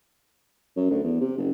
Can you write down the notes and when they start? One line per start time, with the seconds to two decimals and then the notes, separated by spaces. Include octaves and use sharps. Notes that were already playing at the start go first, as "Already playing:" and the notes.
0.76 F#2
0.90 D2
1.04 E2
1.20 C3
1.38 F#1